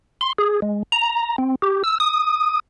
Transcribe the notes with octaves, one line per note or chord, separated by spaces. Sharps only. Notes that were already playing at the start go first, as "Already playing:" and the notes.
C6
G#4
G#3
A#5
C4
G4
E6
D#6